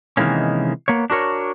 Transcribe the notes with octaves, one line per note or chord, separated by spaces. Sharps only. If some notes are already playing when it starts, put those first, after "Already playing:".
C3 D#3 E3 G#3 A#3 C#4
A#3 B3 C#5
D4 F#4 A#4 C#5